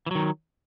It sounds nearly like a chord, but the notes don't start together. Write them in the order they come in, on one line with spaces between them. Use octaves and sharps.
E3 F#3 D#3